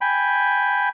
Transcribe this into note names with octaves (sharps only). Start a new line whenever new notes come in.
G5 G#5 B5